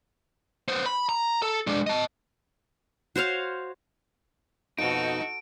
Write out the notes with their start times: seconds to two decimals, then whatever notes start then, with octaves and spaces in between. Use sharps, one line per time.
0.68 B3 C5
0.86 B5
1.09 A#5
1.42 A4
1.67 G#3 D4
1.87 D#5 A5
3.16 F#4 C5 C#5 F5
4.79 F2 B2 D#4 F#4 A4 D7